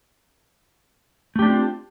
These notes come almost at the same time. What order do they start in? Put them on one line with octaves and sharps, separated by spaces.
A3 G4 D4 C4 F4